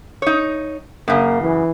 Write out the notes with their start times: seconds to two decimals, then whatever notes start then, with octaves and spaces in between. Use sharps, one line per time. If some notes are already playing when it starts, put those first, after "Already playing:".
0.22 D#4 C#5
1.08 F#2 C#3 A#3
1.41 E3